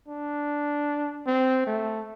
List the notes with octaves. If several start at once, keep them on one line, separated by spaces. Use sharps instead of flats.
D4
C4
A3